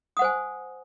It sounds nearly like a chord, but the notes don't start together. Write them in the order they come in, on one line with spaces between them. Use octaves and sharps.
D#6 F#5 C5 G#5